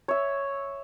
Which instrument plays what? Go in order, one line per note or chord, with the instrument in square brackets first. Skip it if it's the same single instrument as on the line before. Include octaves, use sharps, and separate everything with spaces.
[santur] C#5 E5